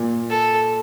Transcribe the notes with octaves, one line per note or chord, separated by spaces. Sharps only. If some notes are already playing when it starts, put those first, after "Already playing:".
Already playing: A#2
A4